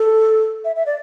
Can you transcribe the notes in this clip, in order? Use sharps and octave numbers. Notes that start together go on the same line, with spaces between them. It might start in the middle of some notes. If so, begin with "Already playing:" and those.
Already playing: A4
E5
E5
D5